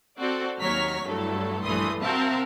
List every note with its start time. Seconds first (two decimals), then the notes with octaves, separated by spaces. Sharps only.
0.20 C4 F#4 A4 C5 D5
0.60 D#2 F#3 C#5 A#5 F6 B6
1.04 G2 F#3 A3 E4 A4
1.64 A#1 G2 E3 A3 C6 D#6
2.01 C4 F#4 A#4 E5 F5 A5